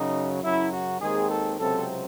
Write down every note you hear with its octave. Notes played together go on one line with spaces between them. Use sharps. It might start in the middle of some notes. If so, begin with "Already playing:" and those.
Already playing: F#2 C#3 F#3 D#4
F#2 C#3 F#3 E4
F#4
D#2 D#3 G#3 C4 G#4
A4
C#2 C3 F#3 C4 A4